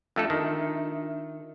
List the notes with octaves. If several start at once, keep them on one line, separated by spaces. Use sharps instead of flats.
F2 A3 D4 F4 A4 E5
D#3